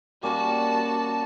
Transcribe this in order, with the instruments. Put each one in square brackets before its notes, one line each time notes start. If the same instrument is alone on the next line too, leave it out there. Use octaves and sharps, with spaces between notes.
[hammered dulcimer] G3 A#3 C#4 [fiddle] F#4 A5